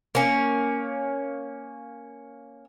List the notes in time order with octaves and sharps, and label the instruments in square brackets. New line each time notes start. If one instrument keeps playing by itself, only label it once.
[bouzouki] A#3 C#4